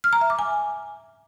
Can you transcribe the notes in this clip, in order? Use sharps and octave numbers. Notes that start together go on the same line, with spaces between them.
F6
A#5
E5
D6
G#5